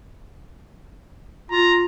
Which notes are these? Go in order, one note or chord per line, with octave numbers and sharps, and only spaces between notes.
F4 A#5